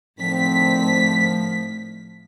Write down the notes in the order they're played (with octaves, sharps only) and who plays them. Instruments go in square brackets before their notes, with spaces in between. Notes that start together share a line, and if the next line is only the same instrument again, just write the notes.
[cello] A2 [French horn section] D3 D#3 C4 [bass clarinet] F3 [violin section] B6